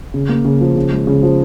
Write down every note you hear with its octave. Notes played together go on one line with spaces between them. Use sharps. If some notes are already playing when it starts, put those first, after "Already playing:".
C#3
A#3
C#3
F3
C#3
G#3
C#3
F3